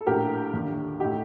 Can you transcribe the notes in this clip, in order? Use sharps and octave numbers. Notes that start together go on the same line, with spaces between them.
A4
A#1 A2 G4 A#4
D#2 D3
A2 D#4 G4